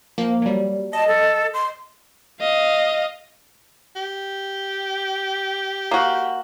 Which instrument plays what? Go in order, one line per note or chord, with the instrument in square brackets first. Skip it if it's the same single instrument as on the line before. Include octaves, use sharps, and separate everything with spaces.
[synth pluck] F3 A#3
F#3 G3
[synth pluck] D#5 [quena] A5
[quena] A4
C6
[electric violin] D#5 F5
[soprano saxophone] G4
[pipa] A#3 F#4